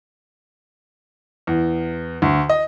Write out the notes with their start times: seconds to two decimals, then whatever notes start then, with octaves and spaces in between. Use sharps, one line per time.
1.47 E2
2.22 D2
2.50 D#5